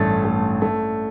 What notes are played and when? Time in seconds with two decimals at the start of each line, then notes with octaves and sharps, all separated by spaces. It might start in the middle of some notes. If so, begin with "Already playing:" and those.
Already playing: A1 G2 A3 A6
0.25 A3
0.62 A3